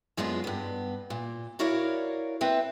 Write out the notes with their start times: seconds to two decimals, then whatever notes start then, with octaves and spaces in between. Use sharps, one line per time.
0.17 F#2 G#3 B3 D4 F4
0.44 G2 B3
1.10 A#2
1.59 E4 F#4 A#4 C#5 D5 F5
2.41 C4 B4 E5